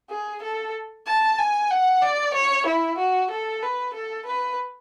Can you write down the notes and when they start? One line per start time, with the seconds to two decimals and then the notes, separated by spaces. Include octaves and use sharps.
0.10 G#4
0.42 A4
1.07 A5
1.39 G#5
1.71 F#5
2.02 D5
2.34 C#5
2.67 E4
2.98 F#4
3.31 A4
3.63 B4
3.94 A4
4.26 B4